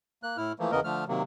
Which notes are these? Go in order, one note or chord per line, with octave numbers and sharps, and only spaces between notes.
A#3 F#6
A2 E4 F6
E3 F3 A3 A#3
E2 C#3 E3 B3 A#4 D#5
D3 F3 A3 F6
C3 D#3 F#3 A#3